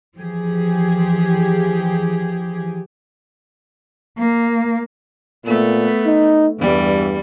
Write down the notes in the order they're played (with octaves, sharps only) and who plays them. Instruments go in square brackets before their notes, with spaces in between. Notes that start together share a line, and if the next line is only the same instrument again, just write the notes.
[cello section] E3 F3 G4 G#4
[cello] A#3
[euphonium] A#2 [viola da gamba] A3 B3
[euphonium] D#4
[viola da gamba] E2 G3 [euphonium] G2